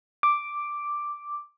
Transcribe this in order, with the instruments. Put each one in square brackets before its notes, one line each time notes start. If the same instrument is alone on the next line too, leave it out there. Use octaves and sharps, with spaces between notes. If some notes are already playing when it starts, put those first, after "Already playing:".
[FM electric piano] D6